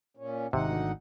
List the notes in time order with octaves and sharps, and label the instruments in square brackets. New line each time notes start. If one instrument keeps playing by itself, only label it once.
[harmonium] A#2 C#4
[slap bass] G#1 [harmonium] D2 D#4 F#5 [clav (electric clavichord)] C3